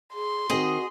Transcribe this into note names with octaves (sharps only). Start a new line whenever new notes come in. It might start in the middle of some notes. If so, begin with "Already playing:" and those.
G#4 C6
D#3 C4 F#4 G#4 D#5